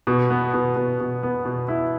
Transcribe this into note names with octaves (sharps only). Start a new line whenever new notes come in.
B2
B3
B2
B2
B2
B3
B2
E4